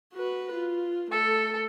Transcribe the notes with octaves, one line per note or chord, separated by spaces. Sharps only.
F#4 B4
F4
A3 A4